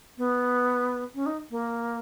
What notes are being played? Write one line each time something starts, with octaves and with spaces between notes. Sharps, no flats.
B3
C#4
D#4
A#3